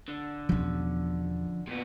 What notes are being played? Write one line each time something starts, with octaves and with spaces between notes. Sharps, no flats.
D3
E2 B2 F3 C#4
A#2 B3